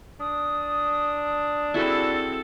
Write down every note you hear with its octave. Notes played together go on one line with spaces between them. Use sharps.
D4 D#6
C4 E4 F#4 G#4 A4